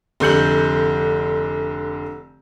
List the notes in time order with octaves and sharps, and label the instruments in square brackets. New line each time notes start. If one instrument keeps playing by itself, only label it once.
[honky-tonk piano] F1 D3 G6 C#7 F#7